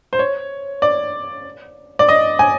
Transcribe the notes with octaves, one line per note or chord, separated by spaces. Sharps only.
C5
C#5
D5
D5
D#5
G#5